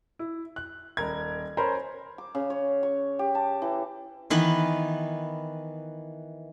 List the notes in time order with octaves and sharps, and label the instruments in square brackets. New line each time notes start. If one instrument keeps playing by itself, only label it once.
[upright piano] E4
F#6
D#1 A#4 G#6
C#4 A#4 C5 B5
[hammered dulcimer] D6
C#3
C#5
C#6
G4
A5
E3
[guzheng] D#3 E3 B3 B4